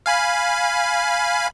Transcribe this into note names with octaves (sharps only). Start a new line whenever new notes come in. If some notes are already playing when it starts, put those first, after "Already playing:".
F5 G#5 B5